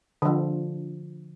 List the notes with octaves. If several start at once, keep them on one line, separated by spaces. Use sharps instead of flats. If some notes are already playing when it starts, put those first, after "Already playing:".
D3 F3